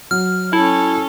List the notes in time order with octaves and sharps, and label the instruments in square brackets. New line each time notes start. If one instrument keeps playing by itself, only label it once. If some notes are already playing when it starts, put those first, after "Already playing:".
[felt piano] F#3 [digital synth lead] F6
[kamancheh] C#4 A4 [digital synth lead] E4